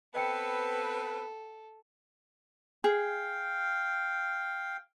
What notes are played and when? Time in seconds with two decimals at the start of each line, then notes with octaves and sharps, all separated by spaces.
0.15 B3 C4 A4 B4 D#5 G5 C#7
2.84 G#4 F5 G5